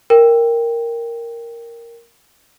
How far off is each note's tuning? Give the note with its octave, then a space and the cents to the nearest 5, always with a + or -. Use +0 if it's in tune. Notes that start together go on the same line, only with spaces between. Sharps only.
A#4 +0 G5 +10